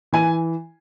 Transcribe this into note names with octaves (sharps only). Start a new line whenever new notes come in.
E3 G#5